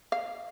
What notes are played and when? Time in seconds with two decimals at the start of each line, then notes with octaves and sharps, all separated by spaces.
0.12 F5